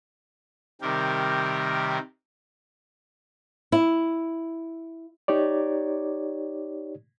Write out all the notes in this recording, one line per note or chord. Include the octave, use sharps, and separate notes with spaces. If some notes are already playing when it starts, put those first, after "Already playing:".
C3 D#3 G3 G4 A#4
E4
D#4 G4 C#5 D5